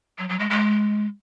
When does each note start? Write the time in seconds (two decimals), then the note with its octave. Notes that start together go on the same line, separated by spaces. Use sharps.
0.18 F#3
0.29 F#3
0.39 G#3
0.50 G#3